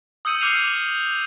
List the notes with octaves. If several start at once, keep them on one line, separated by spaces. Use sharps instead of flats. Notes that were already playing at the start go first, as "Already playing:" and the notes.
D#6 E6 G6 C#7 D#7 F#7
D6 F6 G6 C7 D#7 F7
D6